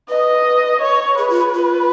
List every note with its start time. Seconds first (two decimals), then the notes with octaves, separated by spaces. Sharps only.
0.09 B4 D#5
0.81 C#5
1.18 G#4 B4
1.30 F4
1.54 F4